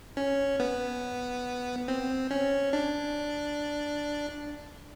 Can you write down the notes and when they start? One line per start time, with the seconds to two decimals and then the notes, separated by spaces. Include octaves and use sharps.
0.17 C#4
0.60 B3
1.88 C4
2.31 C#4
2.73 D4